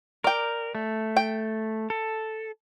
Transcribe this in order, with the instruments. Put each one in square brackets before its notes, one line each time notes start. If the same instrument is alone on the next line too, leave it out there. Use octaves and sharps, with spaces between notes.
[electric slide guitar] A#4 [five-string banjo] D5 G5
[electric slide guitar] A3
[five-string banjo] G5
[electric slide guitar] A4